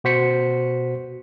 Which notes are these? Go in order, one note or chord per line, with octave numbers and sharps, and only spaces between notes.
B2 F#4 C5 B6 C#7